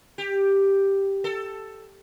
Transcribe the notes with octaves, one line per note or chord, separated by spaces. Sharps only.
G4
A4